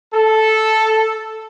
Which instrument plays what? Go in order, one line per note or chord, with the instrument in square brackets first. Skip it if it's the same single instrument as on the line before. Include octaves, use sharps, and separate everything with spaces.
[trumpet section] A4